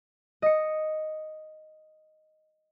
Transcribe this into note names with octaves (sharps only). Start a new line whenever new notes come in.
D#5 C#7